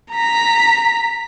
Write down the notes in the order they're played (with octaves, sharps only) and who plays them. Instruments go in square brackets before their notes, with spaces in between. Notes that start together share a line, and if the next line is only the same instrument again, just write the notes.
[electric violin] A#5 B6